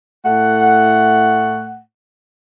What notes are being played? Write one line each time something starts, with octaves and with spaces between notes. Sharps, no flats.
A2 A3 F#5